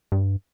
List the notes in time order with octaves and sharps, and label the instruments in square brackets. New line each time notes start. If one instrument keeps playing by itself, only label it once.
[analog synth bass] G2